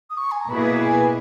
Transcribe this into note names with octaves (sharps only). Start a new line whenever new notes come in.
D#6
C#6
G#5
A#5
B2 A#3 E4 G#4 B4 B5
G#5